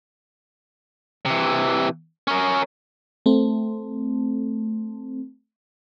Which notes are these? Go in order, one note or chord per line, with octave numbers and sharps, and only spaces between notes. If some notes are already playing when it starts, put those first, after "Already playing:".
C3 E3
C#4 A#4
A3 C4